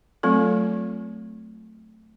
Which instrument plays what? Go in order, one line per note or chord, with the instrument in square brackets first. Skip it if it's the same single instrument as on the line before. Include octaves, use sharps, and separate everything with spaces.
[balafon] F#3 A3 C4 F4 A4